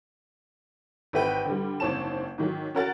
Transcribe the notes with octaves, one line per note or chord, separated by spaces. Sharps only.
G#1 C4 G4 B4 F#5 G5
D3 G3
F#1 G#2 C4 C#5 A5 E7
G#2 D#3 F#3
C#4 F#4 A#4 F#5 A6